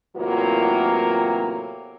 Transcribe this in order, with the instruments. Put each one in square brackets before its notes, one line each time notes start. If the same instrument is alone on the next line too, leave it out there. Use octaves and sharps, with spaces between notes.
[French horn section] E2 A2 C3 F#3 A#3 F4